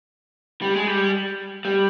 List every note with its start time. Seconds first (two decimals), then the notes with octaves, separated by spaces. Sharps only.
0.62 G3
0.74 G#3
0.87 G3
1.65 G3